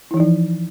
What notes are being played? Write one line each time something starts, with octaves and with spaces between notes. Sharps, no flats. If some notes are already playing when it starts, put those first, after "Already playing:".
E3 F3 D#4 E4